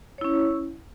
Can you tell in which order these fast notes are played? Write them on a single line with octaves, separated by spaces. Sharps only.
C#5 E4 C#4